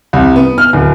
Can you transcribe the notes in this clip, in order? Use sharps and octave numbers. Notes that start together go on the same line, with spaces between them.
C2
B3
F6
D1